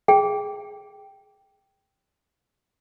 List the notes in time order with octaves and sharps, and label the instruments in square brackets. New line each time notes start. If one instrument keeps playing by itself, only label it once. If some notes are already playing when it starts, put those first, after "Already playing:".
[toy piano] G#4 G5